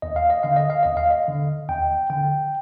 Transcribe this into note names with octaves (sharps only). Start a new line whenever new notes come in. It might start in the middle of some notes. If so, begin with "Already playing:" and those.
D#2 D#5
F5
D#5
D3 F5
D#5
F5
D#2 D#5
F5
D#5
D3
D#2 G5
D3 G5